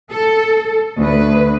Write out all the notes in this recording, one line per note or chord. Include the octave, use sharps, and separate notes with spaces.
A4
D2 B4